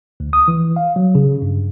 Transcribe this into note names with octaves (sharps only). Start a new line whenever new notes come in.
D2
D#6
E3
F5
F#3
C#3
G2